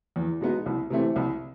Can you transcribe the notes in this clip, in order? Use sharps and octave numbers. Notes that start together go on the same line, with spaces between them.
E2
B2 G#3 B3 D#4
C2
C3 E3 A3 C4
C2